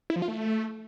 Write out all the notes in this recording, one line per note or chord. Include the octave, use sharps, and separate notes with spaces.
E4
F3
F4
A3